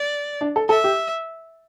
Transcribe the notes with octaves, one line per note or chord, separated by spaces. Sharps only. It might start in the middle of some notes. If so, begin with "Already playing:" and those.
Already playing: D5
D4
A4
A4 E5
G4